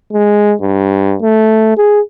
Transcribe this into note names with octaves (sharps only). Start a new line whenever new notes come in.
G#3
G2
A3
G#4